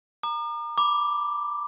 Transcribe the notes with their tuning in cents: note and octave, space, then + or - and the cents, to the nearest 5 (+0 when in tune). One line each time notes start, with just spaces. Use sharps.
A#5 +0 D6 +45
B5 +0 D6 +0